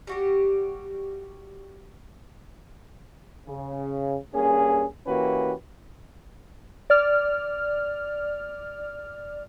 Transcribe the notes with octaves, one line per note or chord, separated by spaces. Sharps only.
G3 F#4 G4
C#3
G2 A#3 C#4 G#4
E3 A#3 C#4 F#4 G4 B4
D5 F6